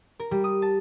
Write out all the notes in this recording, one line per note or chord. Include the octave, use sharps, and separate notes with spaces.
A#4
G3
D#6
A5